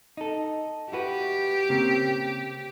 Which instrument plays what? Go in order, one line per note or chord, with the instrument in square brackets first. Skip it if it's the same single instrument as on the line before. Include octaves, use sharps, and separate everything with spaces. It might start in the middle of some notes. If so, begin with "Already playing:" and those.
[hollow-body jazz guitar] D#4 A4
[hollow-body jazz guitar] E4 F#4 B4 [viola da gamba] G4
[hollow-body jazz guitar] C#3 A#3 C4